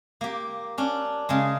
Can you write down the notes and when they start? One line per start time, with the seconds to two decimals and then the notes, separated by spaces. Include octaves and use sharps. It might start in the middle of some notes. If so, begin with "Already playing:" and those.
0.21 A#3 G4
0.78 C#4 D4
1.29 C#3 G#3